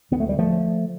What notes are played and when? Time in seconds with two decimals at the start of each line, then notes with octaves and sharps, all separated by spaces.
0.11 D2 D3 B3
0.20 A3
0.29 G3
0.39 F3 A3